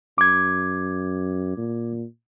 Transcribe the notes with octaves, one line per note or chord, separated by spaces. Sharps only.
F#2 D6 G#6
A#2